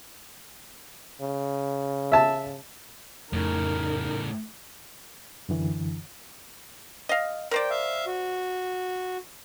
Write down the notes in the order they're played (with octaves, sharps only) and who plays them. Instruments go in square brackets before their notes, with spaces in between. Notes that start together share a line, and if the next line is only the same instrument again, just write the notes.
[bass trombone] C#3
[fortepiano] E5 A5
[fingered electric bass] F2 A3 [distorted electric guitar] A2 C#3 [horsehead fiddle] D#4 A#4
[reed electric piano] F#2 D3 E3
[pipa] D#5 F5
[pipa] A#4 C5 D5 [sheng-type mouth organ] G5
[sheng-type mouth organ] E5 F5
F#4